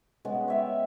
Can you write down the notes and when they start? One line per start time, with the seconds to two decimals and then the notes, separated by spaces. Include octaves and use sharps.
0.25 C#3 G#3 B3 C#4
0.48 C#5 E5 G5